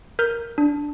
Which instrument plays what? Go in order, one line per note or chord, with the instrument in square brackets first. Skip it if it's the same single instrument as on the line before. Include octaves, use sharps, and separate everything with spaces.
[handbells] A#4 F6 G6
D4